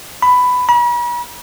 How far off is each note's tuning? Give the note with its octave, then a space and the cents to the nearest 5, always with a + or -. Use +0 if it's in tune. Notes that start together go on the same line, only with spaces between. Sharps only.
B5 +10
B5 -45